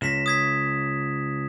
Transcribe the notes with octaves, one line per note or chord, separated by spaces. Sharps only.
C#2 A#6 B6 E7
D#6 G#6 B6